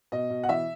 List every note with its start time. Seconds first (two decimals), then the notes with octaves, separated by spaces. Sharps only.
0.12 B2 D#5
0.30 B2
0.43 F#5
0.49 E3 E5